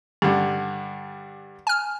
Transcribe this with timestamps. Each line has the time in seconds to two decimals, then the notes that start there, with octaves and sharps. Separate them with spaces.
0.22 G2 D3
1.67 G#5 F6